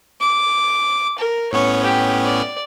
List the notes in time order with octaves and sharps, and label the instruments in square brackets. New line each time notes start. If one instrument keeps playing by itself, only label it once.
[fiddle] D6
A#4
[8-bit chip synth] A2 B3 C#4 [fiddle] C#5
[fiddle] G4
D5